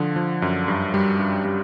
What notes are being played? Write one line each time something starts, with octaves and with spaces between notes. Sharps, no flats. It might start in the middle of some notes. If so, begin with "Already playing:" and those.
Already playing: D3 F3
F3
F#2
G2
G3
G2
G3